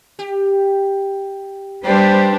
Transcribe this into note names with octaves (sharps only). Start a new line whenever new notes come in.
G4
G3 A#3 D4 G4 B4 C5 D5